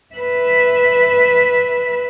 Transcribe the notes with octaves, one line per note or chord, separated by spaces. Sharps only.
B4 E5